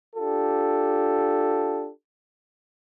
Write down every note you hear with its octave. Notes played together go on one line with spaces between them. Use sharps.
D4 F4 G4 A4